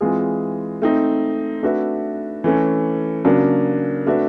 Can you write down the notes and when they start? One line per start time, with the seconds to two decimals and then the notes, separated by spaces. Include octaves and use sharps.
0.01 E3 G#3 C4 F4 G#4
0.82 A3 C4 D#4
1.63 A3 D4 F#4 B4 E5
2.44 E3 A3 C#4
3.25 C#3 F#3 A#3 D4
4.06 A3 D4 F#4 B4 E5